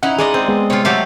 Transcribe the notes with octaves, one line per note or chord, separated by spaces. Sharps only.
C#4 D#4 E4 F#5 F#6
G#3 G#4 D5 D#5
C4
G#3 B3 G#4
C3 G3 F4 C#5
F#3 A3 G4 E5 F5